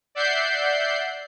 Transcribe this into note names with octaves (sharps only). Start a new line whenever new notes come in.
D5 E5 F#5 G6 C7